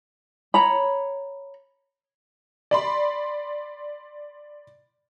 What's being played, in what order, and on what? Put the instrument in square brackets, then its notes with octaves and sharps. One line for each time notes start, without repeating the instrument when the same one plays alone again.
[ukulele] C#5 A#5 B5
[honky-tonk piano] D5 B5 C6